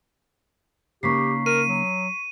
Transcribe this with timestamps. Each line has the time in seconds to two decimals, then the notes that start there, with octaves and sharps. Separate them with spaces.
1.03 C#3 A#3 D#4 G4 C#6 B6 C7
1.46 A#4 D#7
1.68 F#3